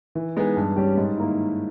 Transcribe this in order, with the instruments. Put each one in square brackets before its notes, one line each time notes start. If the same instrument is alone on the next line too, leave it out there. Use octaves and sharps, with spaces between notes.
[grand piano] E3
G#3 B3 D#4 G#4
G2
G3 C#4 G4
G#2
D#3 A#3 E4